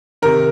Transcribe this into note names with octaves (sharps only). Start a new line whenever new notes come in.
C3 D#3 A#4